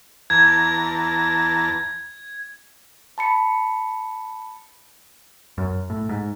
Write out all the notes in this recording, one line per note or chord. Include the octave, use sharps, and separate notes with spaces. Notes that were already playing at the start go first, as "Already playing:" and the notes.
E2 A5 A#5 G#6
A5 B5 C#7
F#2
A2
G#2